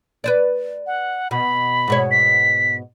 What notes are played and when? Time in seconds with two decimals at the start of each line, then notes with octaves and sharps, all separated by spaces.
0.24 B4 C5 D5
0.87 F#5
1.31 B2 B5
1.88 G#2 B2 C#5
2.11 B6